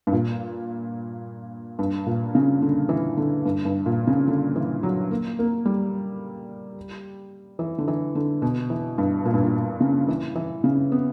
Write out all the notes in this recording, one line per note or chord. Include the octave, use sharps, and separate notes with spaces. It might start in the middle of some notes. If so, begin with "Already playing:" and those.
G2
A#2
G2
A#2
C#3
D3
E3
D3
G2
G2
A#2
C#3
D3
E3
F#3
A#3
A#3
G3
E3
D3
E3
D3
B2
E3
G2
A#2
G2
A#2
C#3
E3
E3
C#3
B3